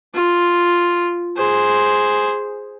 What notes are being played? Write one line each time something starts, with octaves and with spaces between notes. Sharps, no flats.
F4
G#4 C5